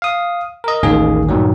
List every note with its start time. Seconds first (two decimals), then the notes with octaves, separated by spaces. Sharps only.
0.02 F5 D#6
0.64 A#4 D#5
0.83 A1 D#2 D#3 A#3 G#4
1.29 G2 A#2 D#3 F#3